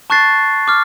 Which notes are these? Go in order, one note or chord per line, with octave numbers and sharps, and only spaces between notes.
A5 C#6 F#6 A6 C7
D6 F6